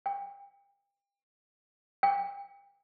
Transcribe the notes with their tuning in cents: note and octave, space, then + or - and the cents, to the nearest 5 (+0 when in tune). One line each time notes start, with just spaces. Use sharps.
G5 +35
G5 +35